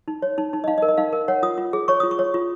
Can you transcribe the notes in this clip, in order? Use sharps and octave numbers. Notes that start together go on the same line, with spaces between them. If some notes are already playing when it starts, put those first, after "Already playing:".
D#4
C#5
D#4
D#4
D#5
D#4 F5
D#5
A#4
D#5
D#4 F5
A#4
C#5 F#5
F4 D#6
F4
G#4
C#5 C#6
F4 D#6
C#6
C#5
F4